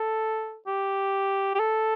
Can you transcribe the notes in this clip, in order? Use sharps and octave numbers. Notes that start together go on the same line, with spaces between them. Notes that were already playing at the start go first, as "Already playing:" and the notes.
Already playing: A4
G4
G4
A4